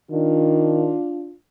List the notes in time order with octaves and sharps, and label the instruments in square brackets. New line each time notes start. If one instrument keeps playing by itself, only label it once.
[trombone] D#3 [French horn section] D4 F4